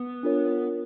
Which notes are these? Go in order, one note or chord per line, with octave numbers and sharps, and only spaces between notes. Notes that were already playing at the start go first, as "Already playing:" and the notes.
Already playing: B3
D4 F4 A#4 C#5